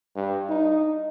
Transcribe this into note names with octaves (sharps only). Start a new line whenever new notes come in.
G2
D#4